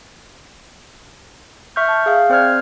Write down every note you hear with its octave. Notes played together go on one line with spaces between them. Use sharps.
E5 C#6 F6 G6
A5
G#4 F5
C4 C5 D5 F6 G#6